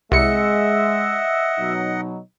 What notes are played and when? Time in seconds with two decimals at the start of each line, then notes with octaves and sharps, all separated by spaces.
0.12 C2 G#3 D#5 E5 F#5 C#7
1.58 B2 F#3 D#4